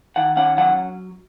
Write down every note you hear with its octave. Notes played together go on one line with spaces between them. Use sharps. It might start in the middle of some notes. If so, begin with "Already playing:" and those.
D#3 F#5
C#4 F#5
F#3 F#5